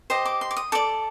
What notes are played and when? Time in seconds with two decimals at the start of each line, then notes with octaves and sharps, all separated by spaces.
0.10 G4 C5 D#5 D#6
0.26 D6
0.41 C6
0.51 D6
0.57 D#6
0.72 A4 D5 D6